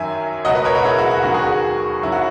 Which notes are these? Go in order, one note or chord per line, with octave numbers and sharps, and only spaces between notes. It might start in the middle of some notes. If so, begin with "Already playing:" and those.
Already playing: F#2 D#3 F#3 E5 G#5
C#2 B2 F#3 D#5 F#5
B4 D#5
A#4 C#5
F#4 A#4
E4 G#4
F#4
F#4
D#2 D#3 F#3 F#4
G#4
F#4
F#2 D#3 F#3 E4
F#4